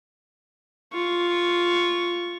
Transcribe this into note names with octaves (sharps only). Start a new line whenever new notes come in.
F4 C#6